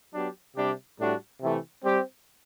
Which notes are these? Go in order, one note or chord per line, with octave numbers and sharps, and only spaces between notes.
F#3 B3 D4 G4
C3 G3 D4 G4
A2 G3 D4 F#4
C3 E3 A3
G3 C4 G4